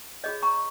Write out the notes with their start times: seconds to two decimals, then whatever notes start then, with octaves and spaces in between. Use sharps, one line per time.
0.24 F4 G#4 C#5 D#5
0.42 A#5 C#6